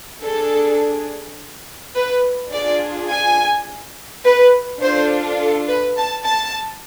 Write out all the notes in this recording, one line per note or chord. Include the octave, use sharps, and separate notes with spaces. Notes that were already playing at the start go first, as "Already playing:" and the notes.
D4 G#4 A4
B4
D4 F4 G#4 D5
G#5
B4
D4 F4 A4 C5
A4
B4
A5
A5